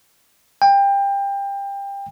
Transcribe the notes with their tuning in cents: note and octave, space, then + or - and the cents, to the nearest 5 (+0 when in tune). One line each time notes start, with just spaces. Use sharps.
G5 +25